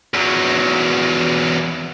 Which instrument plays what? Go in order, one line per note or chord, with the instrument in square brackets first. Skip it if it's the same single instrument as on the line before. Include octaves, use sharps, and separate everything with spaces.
[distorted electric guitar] E2 F#3